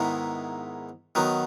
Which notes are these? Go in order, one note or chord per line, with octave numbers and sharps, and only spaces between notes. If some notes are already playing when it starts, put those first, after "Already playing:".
Already playing: G#2 D#3 G#3 B3 E4
D#3 F#3 B3 D#4